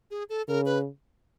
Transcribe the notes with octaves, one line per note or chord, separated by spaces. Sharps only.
G#4
A4
C#3 A#4
B4